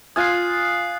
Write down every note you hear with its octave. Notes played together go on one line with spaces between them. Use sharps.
F4 G#5 D#6 F#6 C7